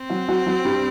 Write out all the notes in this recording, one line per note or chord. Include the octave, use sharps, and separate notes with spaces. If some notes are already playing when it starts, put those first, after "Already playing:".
Already playing: C4
F#3 F#4
F#3 F#4
F#3 F#4
G2 G3